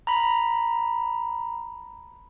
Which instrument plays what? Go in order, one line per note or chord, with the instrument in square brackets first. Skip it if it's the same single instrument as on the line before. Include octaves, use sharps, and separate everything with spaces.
[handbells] A#5 B5